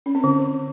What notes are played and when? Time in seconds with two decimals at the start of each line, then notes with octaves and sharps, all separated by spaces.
0.06 C#4
0.15 C4
0.24 D3